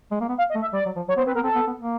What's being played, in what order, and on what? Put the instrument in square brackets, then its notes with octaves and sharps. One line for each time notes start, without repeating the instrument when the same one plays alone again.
[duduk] G#3
A#3
B3
[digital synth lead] F5
D#5
[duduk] A3
[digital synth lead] E5
[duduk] G3 [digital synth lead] D5
[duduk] F#3
F3
[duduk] F#3 [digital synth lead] C#5
[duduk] B3 [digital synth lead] C5
[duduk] C4 [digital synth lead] B4
[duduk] B3 [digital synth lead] A#4
[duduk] C4 [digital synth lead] A4
[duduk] B3
B3
A#3